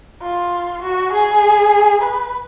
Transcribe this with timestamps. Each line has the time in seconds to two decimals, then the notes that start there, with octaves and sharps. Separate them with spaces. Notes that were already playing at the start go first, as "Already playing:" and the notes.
0.23 F4
0.82 F#4
1.13 G#4
2.02 B4